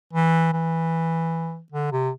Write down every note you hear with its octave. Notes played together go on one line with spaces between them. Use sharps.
E3
E3
D3
C3